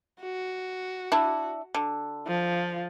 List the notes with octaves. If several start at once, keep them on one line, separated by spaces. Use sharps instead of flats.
F#4
D4 E4
D3
F3